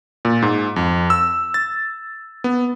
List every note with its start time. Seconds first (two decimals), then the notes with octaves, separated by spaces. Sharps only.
0.25 A#2
0.42 G#2
0.76 F2
1.10 E6
1.54 A6
2.44 B3